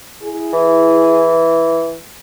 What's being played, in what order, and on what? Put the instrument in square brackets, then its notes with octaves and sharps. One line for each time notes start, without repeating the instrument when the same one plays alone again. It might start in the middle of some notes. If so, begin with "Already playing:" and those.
[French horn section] E4 G#4
[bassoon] E3